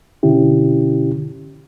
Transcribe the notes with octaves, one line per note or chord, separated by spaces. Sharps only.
B2 D3 C#4 E4 G4